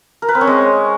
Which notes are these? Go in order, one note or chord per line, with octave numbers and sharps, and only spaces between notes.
A#4
B4
C4
C#4
G#3